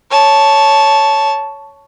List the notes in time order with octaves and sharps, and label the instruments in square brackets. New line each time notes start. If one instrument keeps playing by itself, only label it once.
[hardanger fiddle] C#5 A5